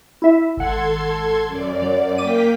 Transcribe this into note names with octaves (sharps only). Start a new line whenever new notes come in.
E4 E5
G#1 A4 F#5 C6 G#6
F#2 D5
F#3
A#3 G5 D6 B6 D#7